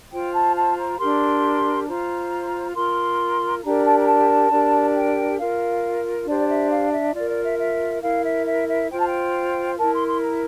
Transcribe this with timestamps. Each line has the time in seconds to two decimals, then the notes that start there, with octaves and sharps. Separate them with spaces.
0.11 F4 C5 G5
0.33 A5
0.56 A5
0.78 A#5
1.00 D4 G4 A#4 C6
1.87 F4 C5 A#5
2.75 F4 A#4 C6
3.62 D4 G4 A#4 A#5
3.85 A5
3.99 A#5
4.07 A5
4.51 D4 G4 A#4
4.95 G5
5.38 F4 A#4 F5
6.26 D4 G4 C5 D5
6.39 D5
6.48 E5
6.70 F5
6.93 E5
7.15 F4 A#4 D5
7.29 D5
7.44 E5
7.59 E5
8.02 E4 A#4 F5
8.24 E5
8.46 E5
8.68 E5
8.90 F4 C5 G5
8.98 A5
9.06 G5
9.77 E4 A#4 A5
9.93 C6
10.07 C6
10.21 A#5